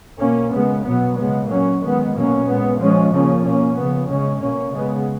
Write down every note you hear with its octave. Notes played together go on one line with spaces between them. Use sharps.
B2 A#3 C#4
C#3 G#3 B3
B2 F#3 B3
C#3 G#3 B3
A#2 F#3 A#3 C#4
D#3 G#3 B3
B2 F#3 A#3 C#4
A#2 G#3 B3
F3 G#3 C#4
C#3 F3 A#3 C#4
B2 A#3 C#4
C#3 F3 B3
C#3 G#3 C#4
B2 A#3 C#4
C#3 G#3 B3